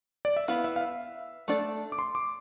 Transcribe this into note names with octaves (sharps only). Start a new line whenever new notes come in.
D5
E5
B3 E4 B4 F5
E5
F5
E5
A3 D4 A4 D5
D6
C6
D6